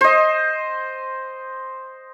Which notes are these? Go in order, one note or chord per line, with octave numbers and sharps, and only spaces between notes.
C5 D#5